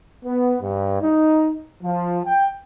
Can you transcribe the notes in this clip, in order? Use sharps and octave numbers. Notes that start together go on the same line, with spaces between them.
B3
G2
D#4
F3
G5